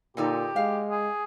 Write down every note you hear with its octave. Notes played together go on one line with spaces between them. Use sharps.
A#2 D3 D#4 G4 A4
G#3 F5
G#4